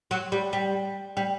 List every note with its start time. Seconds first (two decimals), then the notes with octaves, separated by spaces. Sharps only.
0.11 F#3
0.32 G3
0.53 G3
1.17 G3